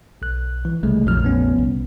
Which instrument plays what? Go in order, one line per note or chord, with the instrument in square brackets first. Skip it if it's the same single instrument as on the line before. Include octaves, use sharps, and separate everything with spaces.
[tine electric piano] B1 F#6
E3
[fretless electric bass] C2 [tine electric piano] C#3 G#3 A3
[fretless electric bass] A#1 F2 A2 [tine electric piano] F#3 F6
[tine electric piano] B3 C#4
[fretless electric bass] C2